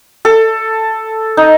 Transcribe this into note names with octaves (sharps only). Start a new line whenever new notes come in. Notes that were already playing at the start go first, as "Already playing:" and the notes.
A4
D#4